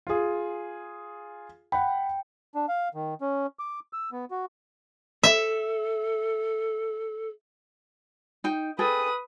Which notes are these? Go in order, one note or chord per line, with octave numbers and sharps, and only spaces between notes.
F4 G#4
F#5 G5 B5
D4
F5
D#3
C#4
D6
E6
B3
F#4
A4 E5
D#4 G5
G#4 A4 B4 G5 D#6